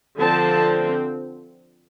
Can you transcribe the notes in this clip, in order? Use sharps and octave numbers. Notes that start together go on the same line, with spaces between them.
D3 F3 C4 A5